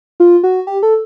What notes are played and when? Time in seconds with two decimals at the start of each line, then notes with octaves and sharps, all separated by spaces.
0.20 F4
0.43 F#4
0.67 G4
0.83 A4